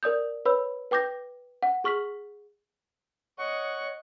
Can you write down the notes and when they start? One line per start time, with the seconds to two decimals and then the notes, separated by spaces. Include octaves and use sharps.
0.03 A#4 D5 D#6 G6
0.46 B4 C#5 B5 E6
0.91 B4 G5 D6 G6 A#6
1.63 F#5
1.84 G#4 C#6 F6 B6 F#7
3.38 C#5 D#5 F#5 C#6